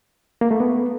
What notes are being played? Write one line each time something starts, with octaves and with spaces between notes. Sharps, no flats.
A#3
A3
B3